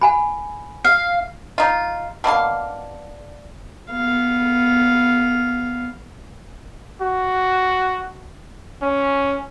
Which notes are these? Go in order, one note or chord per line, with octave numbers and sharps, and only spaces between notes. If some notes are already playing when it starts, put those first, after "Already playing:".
F#5 G#5 B5
F5
D#4 F4
B2 D3 A#3 F5
B3 F5
F#4
C#4